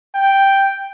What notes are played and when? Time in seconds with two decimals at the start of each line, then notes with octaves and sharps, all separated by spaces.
0.15 G5